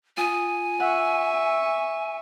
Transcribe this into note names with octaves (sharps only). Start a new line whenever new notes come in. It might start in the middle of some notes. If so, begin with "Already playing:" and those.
F4 G#5 D#6
E5 F#5 C#6